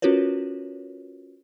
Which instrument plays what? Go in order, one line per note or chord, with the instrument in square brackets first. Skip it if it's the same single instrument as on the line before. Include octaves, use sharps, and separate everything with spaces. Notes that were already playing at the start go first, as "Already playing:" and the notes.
[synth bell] C#4 F4 F#4 A#4 B4 C#5